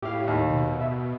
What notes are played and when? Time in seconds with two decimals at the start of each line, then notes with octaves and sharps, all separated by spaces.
0.02 A2 G4 F5
0.28 D#2
0.49 B2
0.81 E5